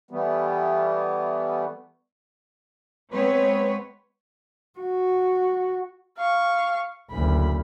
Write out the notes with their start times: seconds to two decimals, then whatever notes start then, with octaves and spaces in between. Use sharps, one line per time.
0.11 E3 G3 A3 B3
3.13 G#3 B3 C4 B4 C#5
4.79 F#4
6.17 F5 C#6
7.11 F#1 D2 B5